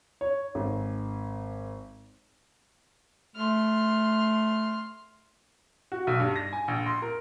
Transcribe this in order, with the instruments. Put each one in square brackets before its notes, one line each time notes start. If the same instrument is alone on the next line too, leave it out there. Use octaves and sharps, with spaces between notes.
[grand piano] C#5
G#1
[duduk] A3 [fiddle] C6 F6
[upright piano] F#4
B1
G2
A#6
G#5
A#1
C6
A#4